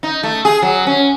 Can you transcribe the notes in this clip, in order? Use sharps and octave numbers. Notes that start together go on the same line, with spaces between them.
D#4
A3
G#4
F#3
C#4